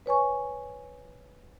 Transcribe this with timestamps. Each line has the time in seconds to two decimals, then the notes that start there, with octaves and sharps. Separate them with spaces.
0.06 B4 C#5 G#5 C#6